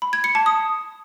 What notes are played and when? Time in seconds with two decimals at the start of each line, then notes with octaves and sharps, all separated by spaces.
0.02 B5
0.13 G#6
0.24 C#7
0.35 A5
0.46 D#6